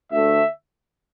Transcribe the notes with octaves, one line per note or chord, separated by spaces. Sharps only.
D2 D3 A3 E5